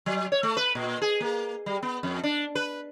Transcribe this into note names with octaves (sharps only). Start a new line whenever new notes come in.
F#3
C#5
A3
B4
A#2
G#4
A#3
G3
B3
F2
D4
B4